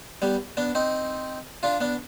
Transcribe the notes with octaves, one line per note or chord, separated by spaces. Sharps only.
G3 B3
B3 D4
C4 D#4
D4 F4
B3 D4